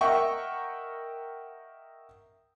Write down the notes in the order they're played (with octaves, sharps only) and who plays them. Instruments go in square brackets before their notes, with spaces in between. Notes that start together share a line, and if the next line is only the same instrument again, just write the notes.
[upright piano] A#4 D#5 E5 F#5 G5 C#6